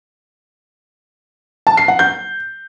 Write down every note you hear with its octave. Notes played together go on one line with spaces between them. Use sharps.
A5
C7
F#5
G6